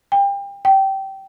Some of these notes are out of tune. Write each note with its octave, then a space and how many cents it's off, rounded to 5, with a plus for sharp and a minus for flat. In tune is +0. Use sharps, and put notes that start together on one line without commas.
G5 +30
G5 -20